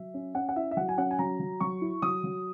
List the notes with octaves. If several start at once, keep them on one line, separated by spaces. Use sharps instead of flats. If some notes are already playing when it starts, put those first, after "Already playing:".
Already playing: F#3 E5
C#4
C#4 F#5
F#5
E4 E5
E5
F#3 F#5
G#5
C#4 F#5
G#5
F#3 A#5
F#3
F#3 C#6
E4
F#3 D#6
F#3